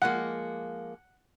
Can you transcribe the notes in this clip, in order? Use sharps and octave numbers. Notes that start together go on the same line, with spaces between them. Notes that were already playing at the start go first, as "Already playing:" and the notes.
F3 G#3 A#3 F#5